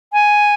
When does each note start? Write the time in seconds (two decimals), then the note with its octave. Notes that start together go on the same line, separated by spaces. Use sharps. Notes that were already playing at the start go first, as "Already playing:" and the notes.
0.13 G#5